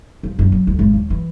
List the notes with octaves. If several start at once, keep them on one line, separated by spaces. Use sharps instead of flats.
F2
F#2
F#3
D2
G#1
D#2
E3